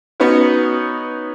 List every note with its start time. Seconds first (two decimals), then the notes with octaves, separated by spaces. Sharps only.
0.20 B3 C#4 D#4 F#4 B4 C#5